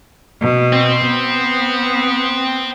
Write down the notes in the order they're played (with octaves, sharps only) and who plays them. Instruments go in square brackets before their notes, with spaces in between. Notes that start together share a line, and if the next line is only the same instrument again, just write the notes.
[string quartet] B2
[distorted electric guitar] C4
[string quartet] B3